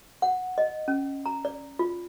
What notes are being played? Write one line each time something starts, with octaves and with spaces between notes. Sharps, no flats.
F#5
D#5
C#4
A#5
D5
F4